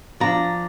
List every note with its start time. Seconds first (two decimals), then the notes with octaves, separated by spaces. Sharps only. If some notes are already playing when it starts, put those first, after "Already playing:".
0.20 F3 D4 A#5